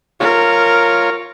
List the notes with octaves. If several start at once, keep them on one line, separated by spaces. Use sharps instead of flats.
F4 A#4 C#5